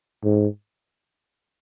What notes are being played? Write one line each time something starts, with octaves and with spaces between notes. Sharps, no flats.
G#2